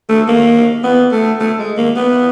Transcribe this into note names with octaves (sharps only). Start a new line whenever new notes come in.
A3
A#3
B3
A3
A3
G#3
A#3
B3